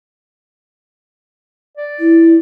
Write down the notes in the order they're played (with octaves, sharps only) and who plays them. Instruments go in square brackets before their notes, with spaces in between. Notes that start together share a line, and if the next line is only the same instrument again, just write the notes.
[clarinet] D5
[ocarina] E4